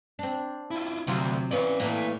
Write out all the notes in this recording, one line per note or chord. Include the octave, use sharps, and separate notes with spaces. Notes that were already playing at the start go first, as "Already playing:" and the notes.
C4 D4
E4 F4
D2 C3 F#3 F4
E3 B3 C#4 D5 F5
A2 E3 A#3